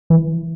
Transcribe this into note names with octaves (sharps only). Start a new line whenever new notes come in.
E3